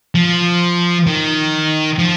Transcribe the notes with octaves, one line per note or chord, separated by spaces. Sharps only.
F3
D#3
F3